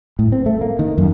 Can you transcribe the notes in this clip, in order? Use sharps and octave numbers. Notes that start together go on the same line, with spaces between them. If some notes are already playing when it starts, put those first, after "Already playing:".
A2
C4
A3
A#3
D#3
F#2